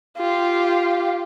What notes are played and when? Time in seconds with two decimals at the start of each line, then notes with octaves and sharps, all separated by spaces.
0.18 F4 G4